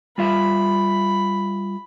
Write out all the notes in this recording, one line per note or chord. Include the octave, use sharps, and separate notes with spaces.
G3 F4 E5 B5